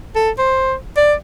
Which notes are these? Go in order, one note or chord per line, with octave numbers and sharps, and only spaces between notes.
A4
C5
D5